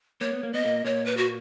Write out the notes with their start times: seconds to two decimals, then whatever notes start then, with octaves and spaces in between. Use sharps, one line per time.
0.21 A#3 C#5
0.33 B3
0.43 A#3
0.53 B3 D#5
0.65 A#2 A#3
0.84 A#2 A#3 C#5
1.06 B4
1.17 F#4